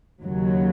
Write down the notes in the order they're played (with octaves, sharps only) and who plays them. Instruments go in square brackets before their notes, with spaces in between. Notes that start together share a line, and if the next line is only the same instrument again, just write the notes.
[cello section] D#2 C#3 F#3